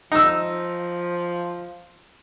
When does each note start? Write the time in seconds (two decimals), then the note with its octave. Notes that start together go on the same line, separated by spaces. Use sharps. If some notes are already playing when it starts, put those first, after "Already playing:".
0.12 F3 D#4 E6